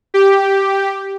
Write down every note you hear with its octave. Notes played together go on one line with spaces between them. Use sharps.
G4